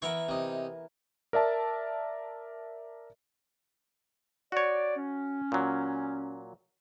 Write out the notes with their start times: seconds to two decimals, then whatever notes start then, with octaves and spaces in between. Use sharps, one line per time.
0.02 E3 B3 A#4 E5 A#5 C#6
0.28 C3 D#4
1.33 A#4 D5 E5 A5
4.52 F#4 C#5 D5
4.97 C#4
5.52 A#2 F#3